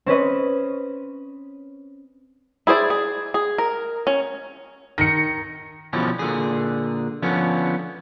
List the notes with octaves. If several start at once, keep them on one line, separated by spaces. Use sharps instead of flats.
C4 C#4 B4 D#5
E4 G#4 C5 D5
G#4
G#4
A#4
C#4
D#3 A#6 C#7
B2 E3 F3 G3 C#4
A#2 D3 G#4
D3 F3 B3 C#4